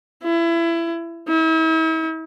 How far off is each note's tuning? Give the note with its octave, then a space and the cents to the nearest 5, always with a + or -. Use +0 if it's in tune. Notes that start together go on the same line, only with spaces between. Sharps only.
E4 +25
E4 -40